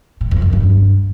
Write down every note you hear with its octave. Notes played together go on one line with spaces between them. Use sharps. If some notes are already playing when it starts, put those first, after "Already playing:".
A2
F2
F#2
G2